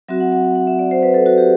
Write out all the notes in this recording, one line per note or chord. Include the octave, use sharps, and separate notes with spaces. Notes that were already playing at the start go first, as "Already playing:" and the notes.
F#3 C4 F#4 E5
F#5
F#5
F#5
F#5
E5
D5
C5
B4
A4
F#4
G4